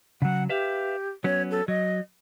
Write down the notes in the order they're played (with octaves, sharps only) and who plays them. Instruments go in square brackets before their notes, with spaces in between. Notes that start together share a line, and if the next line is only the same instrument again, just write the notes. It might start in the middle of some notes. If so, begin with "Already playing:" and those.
[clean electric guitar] C#3 F#3 [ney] F#5
[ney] G4 [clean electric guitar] B4 E5 F5
[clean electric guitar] F#3 B3 C#4 [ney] C#5
[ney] A4
[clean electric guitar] F#3 [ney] D#5